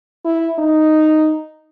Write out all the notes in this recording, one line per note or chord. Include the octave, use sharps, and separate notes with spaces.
E4
D#4